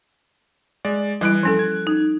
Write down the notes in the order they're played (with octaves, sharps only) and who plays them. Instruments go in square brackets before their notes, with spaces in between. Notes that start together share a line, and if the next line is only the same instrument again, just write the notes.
[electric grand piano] G#3 D5
[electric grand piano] E3 F#6 D7 [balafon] G3 E4
[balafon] F3 C#4 A4
[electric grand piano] G#6
[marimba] D#4